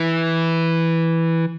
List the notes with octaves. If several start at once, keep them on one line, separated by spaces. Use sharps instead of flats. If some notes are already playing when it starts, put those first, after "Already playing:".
Already playing: E3